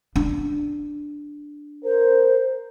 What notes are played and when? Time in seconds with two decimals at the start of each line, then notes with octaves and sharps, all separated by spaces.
0.16 D4
1.84 A#4 C5